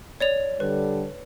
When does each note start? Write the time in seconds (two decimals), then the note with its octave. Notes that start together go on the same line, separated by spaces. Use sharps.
0.20 C#5 D5 F7
0.60 D3 G3 A4 B4